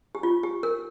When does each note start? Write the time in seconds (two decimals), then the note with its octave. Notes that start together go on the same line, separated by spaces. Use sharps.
0.15 G4
0.23 F4
0.43 G4
0.63 A#4